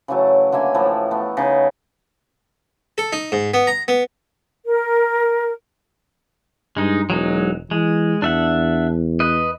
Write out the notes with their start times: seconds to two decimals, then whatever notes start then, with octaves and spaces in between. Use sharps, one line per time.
0.08 C#3 E3 F#3 A3
0.52 D3 A#3 E5 G#5
0.74 A2 E3 F3 A3
1.11 A3 B3
1.37 C#3 D#4
2.98 A4
3.13 D#4
3.32 G#2
3.54 B3
3.67 A#5
3.88 B3
4.66 A#4
6.77 G2 G#3 D#4
7.10 E1 F#3 G#3 D#4
7.71 E3 G#3
8.22 E2 D4 E5 F#5
9.20 B4 D#5